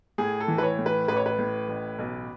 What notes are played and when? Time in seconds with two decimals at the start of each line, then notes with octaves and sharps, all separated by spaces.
0.18 A2 G#4
0.40 A4
0.48 E3
0.58 B4
0.63 C#5
0.79 A2
0.86 B4
1.08 A1 B4
1.16 C#5
1.26 B4
1.39 A2
1.68 A1
1.99 B1